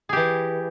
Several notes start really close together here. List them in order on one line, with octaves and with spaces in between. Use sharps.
G#4 G4 E3